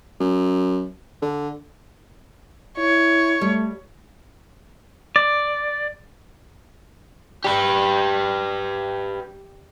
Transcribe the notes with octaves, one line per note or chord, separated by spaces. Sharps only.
F#2
D3
E4 C#5
G3 A3
D5
G3 G4 B4